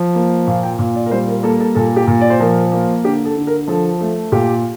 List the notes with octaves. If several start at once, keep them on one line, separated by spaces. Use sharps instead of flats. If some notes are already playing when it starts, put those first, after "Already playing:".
Already playing: F3
A#3
A#2 F5
G5
A#2
D5
A#4
G3 C5
A#4
A#3 A4
A4
A#2 A4
G4
A#2
D5
C5
F3 A#4
A#3
D3 G4
A4
D3
A#4
F3 A4
A3
A#2 G4